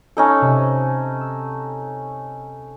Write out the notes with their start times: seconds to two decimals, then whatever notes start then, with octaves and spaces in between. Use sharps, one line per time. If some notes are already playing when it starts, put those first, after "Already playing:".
0.17 C#4 D#4 A4
0.41 C3
1.21 E6